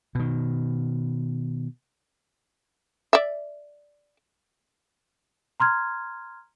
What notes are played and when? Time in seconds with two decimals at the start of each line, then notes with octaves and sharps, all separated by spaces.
0.15 B2 D#3
3.13 D5 E5
5.60 A#5 C6 F6 G#6